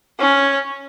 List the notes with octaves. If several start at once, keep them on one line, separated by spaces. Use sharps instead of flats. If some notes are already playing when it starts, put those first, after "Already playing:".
C#4